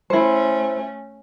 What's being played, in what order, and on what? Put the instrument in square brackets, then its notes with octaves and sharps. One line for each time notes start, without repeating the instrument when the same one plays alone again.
[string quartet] A3 C#4 [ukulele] E4 C5